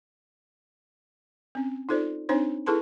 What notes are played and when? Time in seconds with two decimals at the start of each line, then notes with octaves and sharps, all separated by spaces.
1.55 C4 C#4
1.89 D#4 F4 A4 C5 D5
2.29 C4 D4 D#4 C5 C#5
2.66 E4 G#4 A4 B4 A5 C6